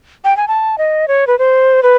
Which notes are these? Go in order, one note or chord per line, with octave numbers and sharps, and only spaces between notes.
G5
G#5
A5
D#5
C#5
B4
C5
B4